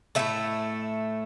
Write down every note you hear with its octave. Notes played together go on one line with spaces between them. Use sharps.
A2 F3 A3 E5